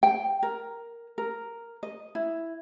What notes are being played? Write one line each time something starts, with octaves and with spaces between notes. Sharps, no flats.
G5
A#4
A#4
D#5
E4